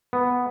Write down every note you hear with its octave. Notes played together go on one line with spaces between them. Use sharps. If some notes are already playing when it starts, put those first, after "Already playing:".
B3